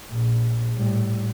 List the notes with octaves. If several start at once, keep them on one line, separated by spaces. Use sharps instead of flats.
A#1
A2 G3